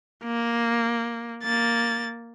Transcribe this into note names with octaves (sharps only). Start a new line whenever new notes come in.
A#3
A#3 A6